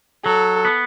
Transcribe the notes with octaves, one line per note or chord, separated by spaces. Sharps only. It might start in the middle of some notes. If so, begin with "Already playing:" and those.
F#3 A4
B3